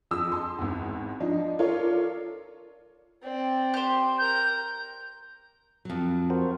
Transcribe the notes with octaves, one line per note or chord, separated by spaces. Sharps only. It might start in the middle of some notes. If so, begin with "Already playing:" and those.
F2 G#4 D#6 E6
A5 C6
G#1 E2
F3 D4 D#4
F4 A4 A#4 C#5 D5
C4 D5
G4 C5
A#4 A#5 G6
F2 F#3
F#4 A#4 C5